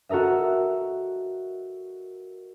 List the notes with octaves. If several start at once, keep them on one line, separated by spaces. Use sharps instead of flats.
F#4 A4 A#4 D#5 E5